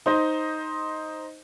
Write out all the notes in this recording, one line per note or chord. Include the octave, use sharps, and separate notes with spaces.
D#4 C5 D#5